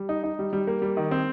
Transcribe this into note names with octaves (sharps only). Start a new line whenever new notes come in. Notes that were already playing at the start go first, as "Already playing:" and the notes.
Already playing: G3
D#4
D#4
G3
G3
A#3
G3
D#3
C4